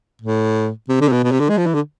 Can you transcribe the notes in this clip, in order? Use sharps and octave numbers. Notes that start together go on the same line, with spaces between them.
A2
C3
D3
C3
B2
B2
C3
D3
G#3
F3
E3
D3